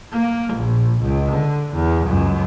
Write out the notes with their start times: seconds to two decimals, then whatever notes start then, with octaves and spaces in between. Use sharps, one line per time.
0.12 A#3
0.54 A#1
1.02 C#2
1.32 D3
1.74 E2
2.07 C#2 F#2